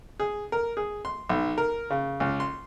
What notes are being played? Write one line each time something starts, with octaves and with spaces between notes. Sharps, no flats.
G#4
A#4
G#4
C6
B1
A#4
C#3
C#2
C6